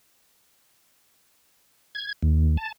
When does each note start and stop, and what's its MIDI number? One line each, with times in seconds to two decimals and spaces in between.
1.95 2.13 92
2.22 2.57 39
2.57 2.72 81